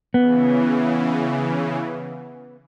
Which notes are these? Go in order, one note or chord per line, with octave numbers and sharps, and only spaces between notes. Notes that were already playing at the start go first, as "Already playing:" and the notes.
C#3 E3 B3